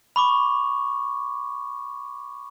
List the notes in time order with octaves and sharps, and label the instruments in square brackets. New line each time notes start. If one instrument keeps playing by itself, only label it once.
[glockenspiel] B5 C#6 D6